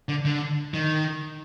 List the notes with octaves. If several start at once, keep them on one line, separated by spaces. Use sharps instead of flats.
D3
D3
D#3